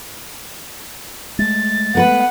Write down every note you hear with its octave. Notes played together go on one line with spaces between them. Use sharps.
G#3 A3 A6
B3 A#4 B4 F#5